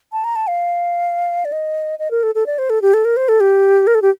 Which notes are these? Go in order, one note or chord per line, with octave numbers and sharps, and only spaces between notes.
A5
A#5
A5
F5
D5
D#5
D#5
A#4
A4
A4
D5
C5
A4
G4
A4
A#4
C5
A4
G4
A#4
A4
G4